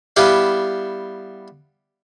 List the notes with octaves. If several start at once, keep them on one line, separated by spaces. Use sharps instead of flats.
G3 B3 E4 G4 E5 F5